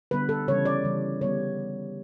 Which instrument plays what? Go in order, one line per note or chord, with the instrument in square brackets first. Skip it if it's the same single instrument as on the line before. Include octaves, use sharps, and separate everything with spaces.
[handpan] D3 G3 B3 B4
A4
C#3 E3 G3 C#5
D5
C#3 E3 G3
D3 G3 B3 C#5